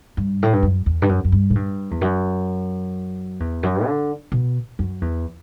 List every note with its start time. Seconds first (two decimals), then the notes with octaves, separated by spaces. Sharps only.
0.17 G2
0.43 A2
0.53 G2
0.63 F#2
0.86 E2
1.02 G2
1.09 F#2
1.25 F#2
1.32 G2
1.50 A2
1.55 G2
1.91 E2
2.01 F#2
3.40 E2
3.63 F#2
3.86 D3
4.32 B2
4.79 F#2
5.01 E2